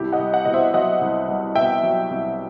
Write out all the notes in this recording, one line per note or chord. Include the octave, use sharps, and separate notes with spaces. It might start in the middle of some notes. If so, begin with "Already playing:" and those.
Already playing: C2 E4 G4
D#5 F#5
C2
D#5 F#5
B2 D#5
C5 E5
F#3 D#5 F#5
C2
C2
B2 E5 G5
F#3
C2